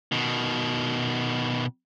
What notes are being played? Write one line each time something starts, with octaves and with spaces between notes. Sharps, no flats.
B2 D#3